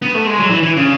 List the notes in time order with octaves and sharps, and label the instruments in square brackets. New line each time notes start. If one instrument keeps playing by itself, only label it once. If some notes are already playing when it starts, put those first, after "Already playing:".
[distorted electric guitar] B3
A3
G#3
F#3
E3
E3
C#3